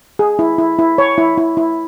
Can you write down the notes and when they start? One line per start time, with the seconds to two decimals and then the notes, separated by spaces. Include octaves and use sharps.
0.19 G#4
0.39 E4
0.58 E4
0.79 E4
0.98 C#5
1.18 E4
1.37 E4
1.57 E4